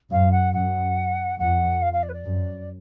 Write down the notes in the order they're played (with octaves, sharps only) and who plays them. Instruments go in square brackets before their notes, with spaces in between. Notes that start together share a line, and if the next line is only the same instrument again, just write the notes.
[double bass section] F#2 [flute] F5
[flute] F#5
[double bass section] F#2 [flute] F#5
[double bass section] F2 [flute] F#5
[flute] F5
F5
D5
B4
D5
[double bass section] F#2